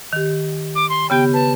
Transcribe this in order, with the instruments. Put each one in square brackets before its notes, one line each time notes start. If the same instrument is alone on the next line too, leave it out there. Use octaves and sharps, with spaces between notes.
[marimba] D#3 G4
[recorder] D6
C6
[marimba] C#3 B3 G4 [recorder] G5
[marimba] B4 [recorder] A5